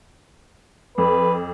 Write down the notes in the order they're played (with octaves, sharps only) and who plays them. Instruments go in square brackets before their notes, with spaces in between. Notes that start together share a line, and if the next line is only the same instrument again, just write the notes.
[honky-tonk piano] F2 [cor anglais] B4